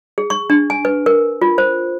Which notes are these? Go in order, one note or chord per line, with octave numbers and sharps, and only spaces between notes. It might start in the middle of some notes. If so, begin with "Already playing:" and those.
G#4
C#6
D4
G#5
B4
A#4
F4
C5